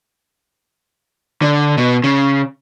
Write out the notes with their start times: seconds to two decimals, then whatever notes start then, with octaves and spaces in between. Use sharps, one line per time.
1.42 D3
1.78 B2
2.04 C#3